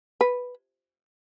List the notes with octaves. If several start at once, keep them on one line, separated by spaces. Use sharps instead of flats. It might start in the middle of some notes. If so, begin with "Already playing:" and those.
B4